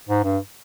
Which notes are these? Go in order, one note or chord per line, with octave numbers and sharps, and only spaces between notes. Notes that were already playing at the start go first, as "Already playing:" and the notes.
G#2
G2